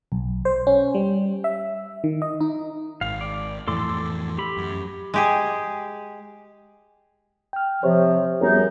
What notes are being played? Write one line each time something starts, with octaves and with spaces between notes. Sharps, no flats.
B1
C5
C#4
G3
E5
D#3
D#5
D#4
G#1 F5
D5
F2 A2 E3 A4 C6 D6
G4 B5
F#2
G#3 G4 G#4
G5 F6
C3 F3 C5 C#5
F#2 G3 B3 D#4 G#4